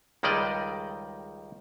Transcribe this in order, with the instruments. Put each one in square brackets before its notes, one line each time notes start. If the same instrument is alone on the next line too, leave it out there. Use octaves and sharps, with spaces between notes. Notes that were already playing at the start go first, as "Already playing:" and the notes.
[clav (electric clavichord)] C#2 D#3 G3 G#3 D5 D#5